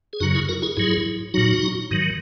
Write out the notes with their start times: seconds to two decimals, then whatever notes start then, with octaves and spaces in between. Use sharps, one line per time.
0.13 G#4
0.20 F#2 C#3 F#3 D#4 F#4
0.35 E4 G#4
0.49 F#4 A#4
0.62 E4 G#4
0.77 G#2 F#3 E4 G#4
1.34 A#2 F#3 D#4 F#4
1.91 G#2 D#3 F#3